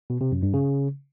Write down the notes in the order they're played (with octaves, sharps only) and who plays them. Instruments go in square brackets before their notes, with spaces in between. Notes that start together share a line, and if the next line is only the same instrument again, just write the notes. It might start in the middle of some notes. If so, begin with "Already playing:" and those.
[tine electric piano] B2
C3
F#2
G2
C#3